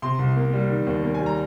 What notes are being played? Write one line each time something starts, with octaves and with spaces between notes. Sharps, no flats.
C3 C6
C2
A#3
G3
D#3
D#2
A#3
G#5
G3
A#5